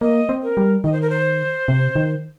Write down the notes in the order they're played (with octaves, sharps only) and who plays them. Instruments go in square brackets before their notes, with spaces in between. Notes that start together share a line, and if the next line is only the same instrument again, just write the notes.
[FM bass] A#3 [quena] D#5
[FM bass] C4
[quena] A#4
[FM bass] G3
[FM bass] D#3 [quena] D#5
[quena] C5
A#4
C5
[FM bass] C3
D#3